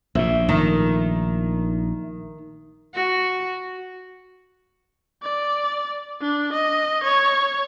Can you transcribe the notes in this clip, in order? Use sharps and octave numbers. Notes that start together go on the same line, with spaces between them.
A#1 A#2 C5 C#5 E5
D#3 A3
F#4
D5
D4
D#5
C#5